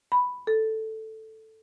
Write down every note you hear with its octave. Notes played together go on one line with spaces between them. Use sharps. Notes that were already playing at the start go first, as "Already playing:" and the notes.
B5
A4